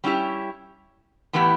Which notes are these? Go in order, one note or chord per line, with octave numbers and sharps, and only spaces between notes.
G3 C#4 E4 G4
A2 E3 B3 E4 G4